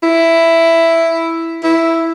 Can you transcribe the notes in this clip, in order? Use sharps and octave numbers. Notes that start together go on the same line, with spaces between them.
E4
E4